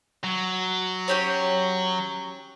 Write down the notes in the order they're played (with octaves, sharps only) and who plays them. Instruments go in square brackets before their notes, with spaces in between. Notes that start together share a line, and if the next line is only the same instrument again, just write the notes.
[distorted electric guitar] F#3
[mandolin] C#4 G4 C#5